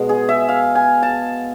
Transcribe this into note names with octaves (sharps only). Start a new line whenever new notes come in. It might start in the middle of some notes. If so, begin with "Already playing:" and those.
Already playing: B2 G#3
G#4
E5
F5
G#5
A5